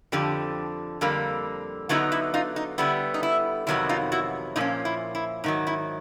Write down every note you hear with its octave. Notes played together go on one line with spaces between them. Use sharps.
F2 D3 F3 G4
F2 D3 G3 A#3
D3 F#3 B3 D#4 E4 F#4
E4
D#4 F4
D#4
D3 G3 B3 E4
D#4
E4
F2 C3 D#3 F#3 B3 E4
D#4 F4
E4 F#4
A#2 F3 A#3 C#4 D#4
E4
E4
G#2 D#3 F#3 D#4
E4